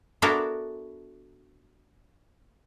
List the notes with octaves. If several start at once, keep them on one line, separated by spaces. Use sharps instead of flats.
B3 D4 E4 F#4 A4 A#4